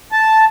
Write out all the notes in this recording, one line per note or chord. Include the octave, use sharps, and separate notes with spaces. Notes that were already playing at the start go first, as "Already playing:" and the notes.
A5